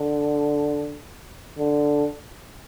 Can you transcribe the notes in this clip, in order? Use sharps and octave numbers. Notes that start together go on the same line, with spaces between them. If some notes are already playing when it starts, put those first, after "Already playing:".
Already playing: D3
D3